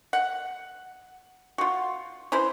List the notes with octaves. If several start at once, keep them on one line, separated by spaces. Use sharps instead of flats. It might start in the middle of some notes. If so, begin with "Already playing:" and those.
F#5
F4 F#4
C#4 E4 B4 C5